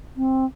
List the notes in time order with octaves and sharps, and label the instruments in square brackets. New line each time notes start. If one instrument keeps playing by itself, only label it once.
[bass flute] C4